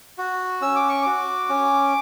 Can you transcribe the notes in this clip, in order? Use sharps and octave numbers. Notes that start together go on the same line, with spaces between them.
F#4
C#4 E6
D6
C#6
F#4 D6
C#4